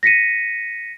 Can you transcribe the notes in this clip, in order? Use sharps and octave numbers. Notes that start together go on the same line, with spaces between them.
A#6 B6 C#7 D#7